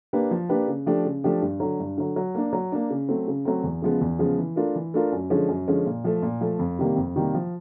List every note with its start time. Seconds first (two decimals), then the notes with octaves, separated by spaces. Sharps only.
0.13 A#3 D4 G4 B4
0.31 F3
0.49 A#3 D4 G4 B4
0.67 C#3
0.86 F3 A3 D4 G4
1.05 C#3
1.24 F3 A3 D4 G4
1.42 G2
1.60 D3 F#3
1.80 G2
1.98 D3 F#3
2.16 F#3
2.35 A#3 D4
2.53 F#3
2.72 A#3 D4
2.90 C#3
3.09 F#3 A3 C4
3.28 C#3
3.45 F#3 A3 C4
3.64 E2
3.82 C#3 F3 G#3 B3
4.01 E2
4.19 C#3 F3 G#3 B3
4.38 E3
4.56 A3 D4 F4 A#4
4.76 E3
4.94 A3 D4 F4 A#4
5.12 F#2
5.30 D3 F3 G#3 C#4
5.49 F#2
5.68 D3 F3 G#3 C#4
5.86 A#2
6.04 F3 A3
6.22 A#2
6.41 F3 A3
6.59 F2
6.79 C3 D#3 G3 A#3
6.96 F2
7.16 C3 D#3 G3 A#3
7.34 F3